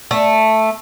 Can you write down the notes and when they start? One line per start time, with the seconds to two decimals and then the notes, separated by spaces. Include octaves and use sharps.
0.11 A3